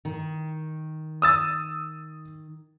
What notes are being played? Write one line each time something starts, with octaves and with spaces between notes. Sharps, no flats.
D#3
D#6 E6 A6